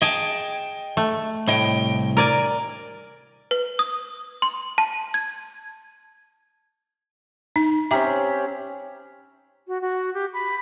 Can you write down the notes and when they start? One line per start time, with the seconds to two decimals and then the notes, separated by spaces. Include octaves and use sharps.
0.02 G#4 D#5 G5 A5
0.97 A3
1.47 C2 A2 D#5 G5
2.17 A#4 D5 G#5
3.51 B4
3.79 D#6
4.42 C6
4.78 A5
5.14 G#6
7.56 D#4
7.91 C4 C#4 G4 E5 A#5
9.68 F#4
9.82 F#4
10.14 G4
10.33 B5